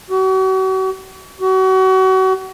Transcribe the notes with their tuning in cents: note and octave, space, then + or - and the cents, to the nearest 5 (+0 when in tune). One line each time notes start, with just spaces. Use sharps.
F#4 +40
F#4 +35